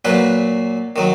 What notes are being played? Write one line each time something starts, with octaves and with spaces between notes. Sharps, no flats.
A#2 F#3 B4
D#3 F#3